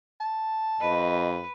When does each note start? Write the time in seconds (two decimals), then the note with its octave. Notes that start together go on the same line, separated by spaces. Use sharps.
0.20 A5
0.81 F2 B4 D#5